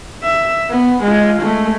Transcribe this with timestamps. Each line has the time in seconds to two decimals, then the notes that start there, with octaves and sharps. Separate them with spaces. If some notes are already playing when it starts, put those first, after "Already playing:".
0.23 E5
0.70 B3
1.04 G#3 F4
1.42 G#3 A3